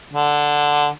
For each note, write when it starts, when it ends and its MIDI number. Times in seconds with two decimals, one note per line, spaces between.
0.14 0.88 50